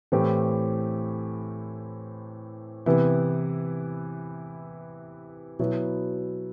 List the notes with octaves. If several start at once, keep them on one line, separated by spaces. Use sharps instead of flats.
A2 E3 A3 C4 G4
C3 E3 B3 E4
B2 F#3 B3 E4